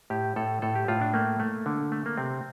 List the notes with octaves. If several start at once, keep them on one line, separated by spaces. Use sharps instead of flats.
A2 G4
A2 A4
A2 A4
G4
A2 F4
D4
A3 A#3
A3
D3
A3
A#3
C3 C4